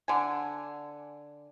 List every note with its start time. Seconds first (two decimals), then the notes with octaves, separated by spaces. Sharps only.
0.08 D3 G#5